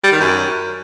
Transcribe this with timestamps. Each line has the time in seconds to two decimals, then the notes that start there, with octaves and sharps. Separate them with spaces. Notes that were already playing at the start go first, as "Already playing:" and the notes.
0.04 G3
0.12 D#3
0.21 F#2